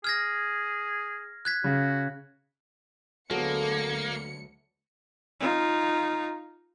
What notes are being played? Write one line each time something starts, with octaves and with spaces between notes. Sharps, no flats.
G#4 F6 G#6 A#6
F#6 G#6 B6
C#3 F#4
D2 F#3 G#3 A#3 B3 A4 C#7
D#4 F4